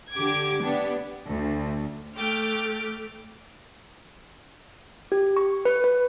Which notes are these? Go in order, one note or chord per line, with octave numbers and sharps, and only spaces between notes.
D3 G4 D6 G#6
B3 D4 G4
D2
A3 G5 D6 F6
G4
C#6
B4
B4